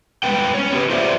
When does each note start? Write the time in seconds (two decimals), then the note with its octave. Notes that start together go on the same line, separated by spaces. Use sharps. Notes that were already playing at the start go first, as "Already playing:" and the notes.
0.23 G3 G#3 B3 B4 G5
0.54 C#4 C#5
0.73 B3 G4 A4 B4
0.90 F4 G#4 C5 D5 E5